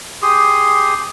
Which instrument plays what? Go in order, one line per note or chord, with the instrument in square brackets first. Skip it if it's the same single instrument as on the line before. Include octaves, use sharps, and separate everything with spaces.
[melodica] G4 G#4 C6 D#6